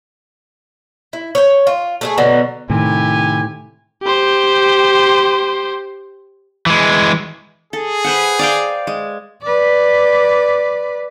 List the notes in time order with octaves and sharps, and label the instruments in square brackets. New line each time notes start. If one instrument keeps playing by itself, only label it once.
[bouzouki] E4
C#5 G5
F4
A3 D4 G#4
B2 D3 F#3 B3
[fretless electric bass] A2 [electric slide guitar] C3 D#3 [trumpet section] E4 G4 G#5
[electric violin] G4 C5
[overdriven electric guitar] E3 G#3
[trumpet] G#4 [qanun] A4
[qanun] B4 C5 F#5
D5 F5 G5
G#3
[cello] B4 D5